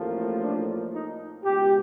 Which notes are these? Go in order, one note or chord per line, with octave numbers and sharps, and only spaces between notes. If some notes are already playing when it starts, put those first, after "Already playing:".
Already playing: A1 A2 F3 A#3
D4
D#4
C#2 B2 G#3 G4